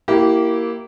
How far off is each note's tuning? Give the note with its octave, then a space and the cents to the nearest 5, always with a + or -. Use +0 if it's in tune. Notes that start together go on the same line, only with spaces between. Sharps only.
A#3 +0 E4 +0 G4 -25